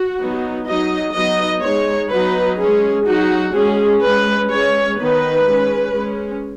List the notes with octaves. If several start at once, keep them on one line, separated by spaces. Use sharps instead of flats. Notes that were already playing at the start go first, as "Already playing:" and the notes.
Already playing: F#4
F#3 B3 D#4
F#3 D#4 D#5
F#3 B3 D#4 D#5
G#3 D#4 C#5
F#3 B3 D#4 B4
G#3 C#4 G#4
F#3 D#4 F#4
G#3 C#4 G#4
G#3 C#4 B4
G#3 C#4 C#5
D#3 B3 D#4 B4
G#3 C#4
G#3 C#4